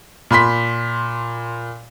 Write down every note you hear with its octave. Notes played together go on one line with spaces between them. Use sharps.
A#2 B5 C6 B6